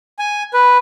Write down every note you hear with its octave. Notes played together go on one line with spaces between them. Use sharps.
G#5
B4